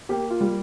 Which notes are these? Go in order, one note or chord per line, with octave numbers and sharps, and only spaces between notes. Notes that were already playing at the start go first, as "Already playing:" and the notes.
A#3 G4
F4
G3